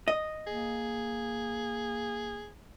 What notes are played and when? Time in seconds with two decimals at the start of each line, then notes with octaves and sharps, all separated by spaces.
0.08 D#5
0.47 A#3 G#4